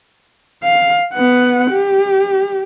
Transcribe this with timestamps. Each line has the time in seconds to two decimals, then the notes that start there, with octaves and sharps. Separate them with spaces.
0.63 F5
1.14 B3 F#5
1.71 G4